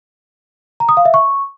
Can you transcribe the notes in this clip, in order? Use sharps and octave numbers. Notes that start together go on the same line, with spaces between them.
A#5
D#6
F5
E5
C#6